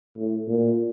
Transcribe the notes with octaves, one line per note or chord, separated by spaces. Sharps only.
A2
A#2